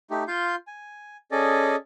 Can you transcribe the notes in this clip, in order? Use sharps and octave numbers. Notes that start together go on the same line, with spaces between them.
A3 D#4 G4
F4 F5 C6 G6
G#5
C#4 G#4 A4 D5 D#5